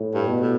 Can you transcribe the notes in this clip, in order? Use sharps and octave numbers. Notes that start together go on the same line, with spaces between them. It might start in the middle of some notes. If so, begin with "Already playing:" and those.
Already playing: A2
G2
B2
A2